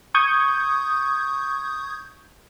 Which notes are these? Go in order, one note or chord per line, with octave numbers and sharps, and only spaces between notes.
C#6 D#6 G6 G#6